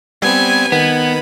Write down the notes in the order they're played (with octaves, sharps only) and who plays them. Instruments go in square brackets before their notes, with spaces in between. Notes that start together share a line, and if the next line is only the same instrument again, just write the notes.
[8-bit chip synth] G3 B3 C4 [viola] G#5
[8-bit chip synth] D#3 B5 [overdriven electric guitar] B3